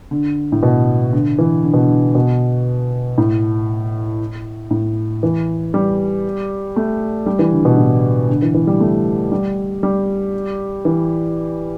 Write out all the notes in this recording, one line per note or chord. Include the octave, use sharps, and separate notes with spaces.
D3
A2
B2
D3
E3
D3
B2
D3
B2
A2
A2
E3
G3
A3
G3
E3
D3
B2
A2
D3
E3
E3
G3
A3
G3
G3
E3